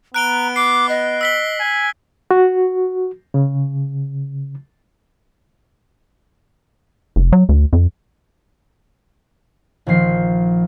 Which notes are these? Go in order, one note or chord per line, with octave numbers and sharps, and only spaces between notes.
B3 A#5 F#6 D7 G7
D6 C7 D7
D#5
E6 B6 G7
G#5
F#4
C#3
F1
F#3
D2
F2
A#1 D#3 F3 C7